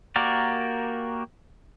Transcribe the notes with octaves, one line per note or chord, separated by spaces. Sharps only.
A#3 F#4 G4 A#4 D5